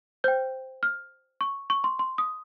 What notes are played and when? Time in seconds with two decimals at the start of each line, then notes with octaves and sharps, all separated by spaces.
0.24 C5 G5 G6
0.83 F6
1.41 C#6
1.70 C#6
1.84 C6
1.99 C6
2.18 D#6